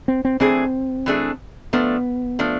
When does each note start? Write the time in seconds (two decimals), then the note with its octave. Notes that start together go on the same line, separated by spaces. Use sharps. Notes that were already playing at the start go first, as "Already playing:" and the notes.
0.08 C4
0.25 C4
0.40 E3 A3 C4 D4 G#4
1.06 E3 A3 D4 G#4
1.73 F3 A3 B3 D4
2.39 F3 A3 D4